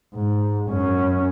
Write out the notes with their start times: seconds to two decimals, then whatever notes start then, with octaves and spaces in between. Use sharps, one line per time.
0.15 G#2
0.70 F#2 C#4